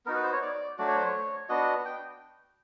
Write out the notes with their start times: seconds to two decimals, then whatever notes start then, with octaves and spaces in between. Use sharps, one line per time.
0.06 B3 D#4 F#4 A#4
0.16 B4
0.24 C5
0.33 C#5
0.42 D5
0.78 F#3 A3 D4 F#4 D5
0.87 C#5
0.96 C5
1.05 C#5
1.49 B3 D4 F#4 D#5
1.85 G5